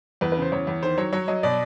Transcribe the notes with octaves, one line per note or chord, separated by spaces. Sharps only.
E2 B4
C#3 B4
C5
E2 C#5
E2
D#3 C5
F#3 C#5
F#3 C#5
F#3 D#5
B2 D5